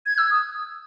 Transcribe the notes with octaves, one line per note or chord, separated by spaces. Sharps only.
G#6
E6
D#6